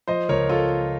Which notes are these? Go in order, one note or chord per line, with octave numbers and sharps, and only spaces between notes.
F3 C5 D#5
C#2 A#4 C#5
F4 A4